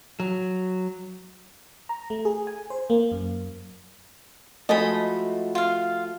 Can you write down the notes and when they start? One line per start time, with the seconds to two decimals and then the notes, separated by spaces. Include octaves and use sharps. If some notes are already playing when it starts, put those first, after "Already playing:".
0.20 F#3
1.89 A#5
2.10 A3
2.25 G#4
2.47 G#5
2.70 C5
2.90 A#3
3.12 F#2
4.69 F3 G#3 A3 F#4 D#5 A5 B5
5.55 F4 F5